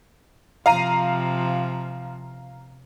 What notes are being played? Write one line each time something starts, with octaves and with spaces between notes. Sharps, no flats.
C3 F3 F5 A#5 D#7